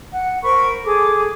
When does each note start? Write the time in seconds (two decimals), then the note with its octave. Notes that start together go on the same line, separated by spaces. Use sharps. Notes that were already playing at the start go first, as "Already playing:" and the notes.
0.14 F#5
0.43 A#4 C5 B5 C#6
0.84 G#4 A4 D6